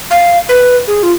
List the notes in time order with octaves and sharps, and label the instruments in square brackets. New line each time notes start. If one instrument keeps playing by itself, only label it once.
[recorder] F5
B4
G#4
F4